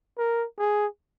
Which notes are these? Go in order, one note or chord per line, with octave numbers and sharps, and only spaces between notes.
A#4
G#4